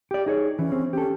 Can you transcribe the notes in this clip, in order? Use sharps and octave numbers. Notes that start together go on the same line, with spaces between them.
G4 D5
D#4 G#4 C#5
E3 C#4
C4
C#4 G4 A4